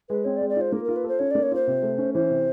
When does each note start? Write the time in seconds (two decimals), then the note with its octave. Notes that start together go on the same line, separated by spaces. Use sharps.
0.09 G#3 B4
0.25 C4 C#5
0.37 D5
0.41 G#3
0.49 D5
0.57 F4 C5
0.72 A#3 A#4
0.85 F4 A#4
0.96 B4
1.04 A4 C5
1.19 C#4 C#5
1.31 A#3 D5
1.43 C#5
1.51 F4 C5
1.67 C3
1.82 A3
1.98 C#4
2.14 E3 C5
2.30 C3